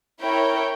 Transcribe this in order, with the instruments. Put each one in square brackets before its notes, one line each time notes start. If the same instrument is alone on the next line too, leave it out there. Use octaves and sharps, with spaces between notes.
[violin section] E4 A#4 C#5 G5